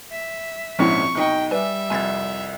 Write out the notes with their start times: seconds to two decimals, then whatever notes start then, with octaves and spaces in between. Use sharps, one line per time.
0.11 E5
0.79 A#1 G#2 F3 C4 C#4 E4 C#6
1.15 B1 D#4 D#5 G5
1.51 G3 B4 D5 E5 G#5
1.90 C2 F2 G#5 G#6 A6